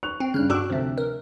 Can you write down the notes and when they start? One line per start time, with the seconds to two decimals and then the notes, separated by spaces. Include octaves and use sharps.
0.03 C#6 F#6 F7
0.20 C4
0.34 G2 C#3 F6 F#6
0.50 G2 D4 F#4 D6 E6 F#6
0.70 D2 C3 F3 A3
0.98 A#4